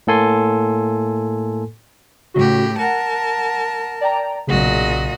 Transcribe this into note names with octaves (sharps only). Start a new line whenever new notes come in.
A2 A#3 A4 G#5 C6
A2 C#3 F#4 G4
A#4 F#5 A5
D5 G5 A#5
B1 A#2 C#3 F#4 D#5